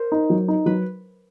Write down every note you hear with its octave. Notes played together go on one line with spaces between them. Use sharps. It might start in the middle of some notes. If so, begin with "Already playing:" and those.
Already playing: A#4 C5
D#4
F#3
D#4
F#3 B4